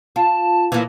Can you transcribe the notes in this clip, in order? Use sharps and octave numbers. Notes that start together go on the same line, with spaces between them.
F4 A5
A#2 E3